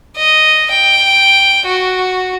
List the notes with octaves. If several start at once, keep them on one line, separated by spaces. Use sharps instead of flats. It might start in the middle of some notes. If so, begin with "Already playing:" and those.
D#5
G5
F#4